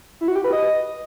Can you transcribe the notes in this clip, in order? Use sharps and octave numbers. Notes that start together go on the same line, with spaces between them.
E4
F#4
G4
B4
D#5